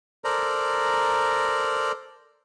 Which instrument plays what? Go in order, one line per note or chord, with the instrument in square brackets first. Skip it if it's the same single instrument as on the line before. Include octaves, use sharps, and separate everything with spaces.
[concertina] A4 A#4 C5 D5 A#5